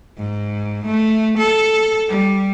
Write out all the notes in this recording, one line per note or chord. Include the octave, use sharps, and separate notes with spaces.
G#2
A3
A4
G3